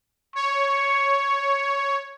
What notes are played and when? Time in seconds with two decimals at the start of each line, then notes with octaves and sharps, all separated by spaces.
0.35 C#5 C#6